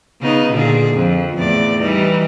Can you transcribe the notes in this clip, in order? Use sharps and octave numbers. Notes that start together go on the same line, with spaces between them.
C#3 B3 D#4
A#2 D3 G#4
F2
E2 A2 D5
E3 G3 D#4